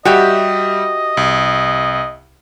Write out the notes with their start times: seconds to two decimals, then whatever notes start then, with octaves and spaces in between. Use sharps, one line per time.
0.05 G3 F#4 G4 D#5 E5
1.17 C2